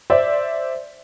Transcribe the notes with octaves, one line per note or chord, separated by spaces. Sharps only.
C5 D5 E5